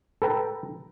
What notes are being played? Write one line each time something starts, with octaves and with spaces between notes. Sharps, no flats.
A4 B4 G5 A#5